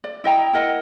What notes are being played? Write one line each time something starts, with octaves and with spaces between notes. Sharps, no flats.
D5
E4 D#5 G5 A#5
E4 A#4 D#5 F#5